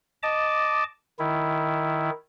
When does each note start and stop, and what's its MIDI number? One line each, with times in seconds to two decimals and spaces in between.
0.23 0.84 75
0.23 0.84 81
0.23 0.84 86
1.19 2.10 51
1.19 2.10 64